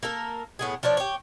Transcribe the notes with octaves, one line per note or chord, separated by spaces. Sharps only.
A#3 A4 A#4
A2 B3 G#4
F3 D4 C#5 D5
G4 C#5